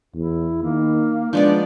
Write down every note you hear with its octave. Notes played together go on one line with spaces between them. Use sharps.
E2 E4
D#3 A#3
F3 G#3 B3 D4 D5